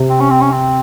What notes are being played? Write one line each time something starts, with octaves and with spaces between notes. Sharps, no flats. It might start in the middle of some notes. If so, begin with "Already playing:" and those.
Already playing: C3
C4
C#4
C4
C#4
C4